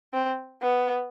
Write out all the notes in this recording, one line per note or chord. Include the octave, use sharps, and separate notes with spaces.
C4
B3